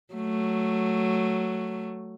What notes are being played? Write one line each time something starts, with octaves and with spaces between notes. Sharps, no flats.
F#3 A3